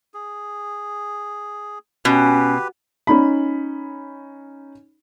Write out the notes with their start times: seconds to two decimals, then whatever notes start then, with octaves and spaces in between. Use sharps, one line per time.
0.14 G#4
2.05 B2 C#4 G4 B4
3.07 C#4 D#4 B5